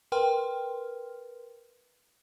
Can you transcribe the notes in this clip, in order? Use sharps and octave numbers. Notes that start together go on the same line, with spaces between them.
A#4 B4 G5 C6 F6